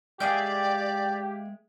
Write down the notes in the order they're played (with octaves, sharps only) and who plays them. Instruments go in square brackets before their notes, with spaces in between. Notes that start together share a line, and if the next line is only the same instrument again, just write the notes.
[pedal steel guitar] G#3 E5 G5 [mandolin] A#3 G#4 G6 [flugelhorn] G4 [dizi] D5